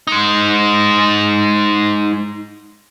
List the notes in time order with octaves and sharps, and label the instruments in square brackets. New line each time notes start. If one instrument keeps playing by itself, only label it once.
[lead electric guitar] G#3 D#4